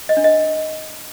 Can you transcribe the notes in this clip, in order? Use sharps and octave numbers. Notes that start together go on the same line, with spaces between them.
D#5
D4
D#5